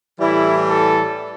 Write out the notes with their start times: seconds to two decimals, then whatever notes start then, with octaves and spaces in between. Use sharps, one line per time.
0.20 A2 E3 G3 E4
0.70 A4